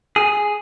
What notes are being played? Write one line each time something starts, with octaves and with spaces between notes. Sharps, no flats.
G#4